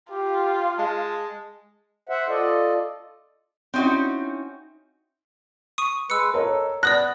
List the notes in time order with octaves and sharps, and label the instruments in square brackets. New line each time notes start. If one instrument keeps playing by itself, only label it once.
[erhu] F4 [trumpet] G4
[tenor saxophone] G#3 [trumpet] A5
[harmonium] C5 E5 F#5
F4 A4 D5 D#5
[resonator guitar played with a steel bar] C4 C#4 D#4 E4 F#4
[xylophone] C#6 D#6 D#7
[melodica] G#3 B4 [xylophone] E6 C#7
[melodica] A4 [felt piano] A#4 C#5 D#5
[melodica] B3 [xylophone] D5 D#6 A#6 [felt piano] F#6